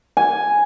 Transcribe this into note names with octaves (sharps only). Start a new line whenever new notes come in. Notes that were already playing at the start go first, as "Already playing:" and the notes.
G#5